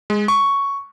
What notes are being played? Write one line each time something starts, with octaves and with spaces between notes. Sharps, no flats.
G#3
C#6